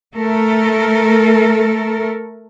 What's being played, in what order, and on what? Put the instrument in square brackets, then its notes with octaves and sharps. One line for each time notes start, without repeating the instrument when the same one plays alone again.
[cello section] A3 A4 A#4